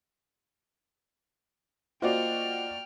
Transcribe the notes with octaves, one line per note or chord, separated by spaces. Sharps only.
A#3 F4 F#4 C5 D5 D#5 G5 F6